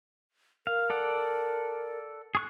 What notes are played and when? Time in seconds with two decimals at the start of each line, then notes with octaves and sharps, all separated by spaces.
0.67 A#4 F5
0.90 A4 D5 F#5
2.35 G#4 C#6 F#6